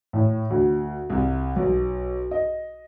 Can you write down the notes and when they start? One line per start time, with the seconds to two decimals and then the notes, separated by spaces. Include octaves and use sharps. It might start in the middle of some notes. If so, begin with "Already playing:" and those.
0.13 A2
0.50 D2
1.10 C2
1.56 B1
2.31 D#5